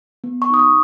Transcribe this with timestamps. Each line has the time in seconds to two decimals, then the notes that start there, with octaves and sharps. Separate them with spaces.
0.24 B3
0.42 C#6
0.50 D#4 D#6
0.59 C#6